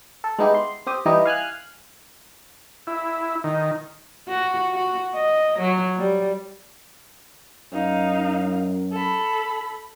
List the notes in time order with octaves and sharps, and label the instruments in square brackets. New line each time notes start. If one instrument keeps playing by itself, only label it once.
[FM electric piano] A4
G#3 B3 D#4 E4 G4
C6
C4 G4 D#6
E3 G3 D#4 E4 G4 D#5
F5 G#5 F6 F#6
[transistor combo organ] E4
D#3
[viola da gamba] F#4
F#4
D#5
F#3
G3
[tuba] F#2 [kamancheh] D#4 F5
[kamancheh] A4 B5